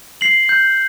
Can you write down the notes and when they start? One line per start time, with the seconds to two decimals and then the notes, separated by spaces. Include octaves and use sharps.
0.21 C7 F#7
0.49 G6